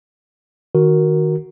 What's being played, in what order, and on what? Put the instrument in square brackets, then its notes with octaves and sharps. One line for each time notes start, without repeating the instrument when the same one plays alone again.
[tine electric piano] D#3 F#4 A#4